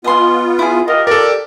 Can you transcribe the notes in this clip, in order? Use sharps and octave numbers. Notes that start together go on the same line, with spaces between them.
B3 F4 D#5 G#5 C6
E4 G#4
F4 G4 A#4 D#5
A4 A#4 D5